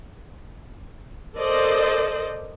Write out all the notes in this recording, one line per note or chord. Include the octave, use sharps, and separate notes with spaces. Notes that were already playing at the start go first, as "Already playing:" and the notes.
A4 A#4 C5 D5 D#5